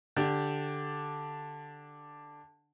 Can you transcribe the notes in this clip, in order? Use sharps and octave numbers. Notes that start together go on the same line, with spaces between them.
D3 D4 G4